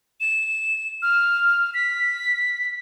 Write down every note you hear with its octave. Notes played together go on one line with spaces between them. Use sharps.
E7
F6
B6